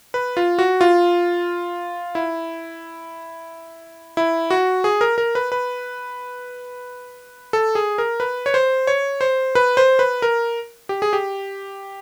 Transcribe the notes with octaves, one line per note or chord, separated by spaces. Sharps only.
B4
F4
F#4
F4
E4
E4
F#4
G#4
A#4
A#4
B4
B4
A4
G#4
A#4
B4
C#5
C5
C#5
C5
B4
C5
B4
A#4
G4
G#4
G4